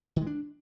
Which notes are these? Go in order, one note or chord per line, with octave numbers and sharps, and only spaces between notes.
D#3
G#3
D4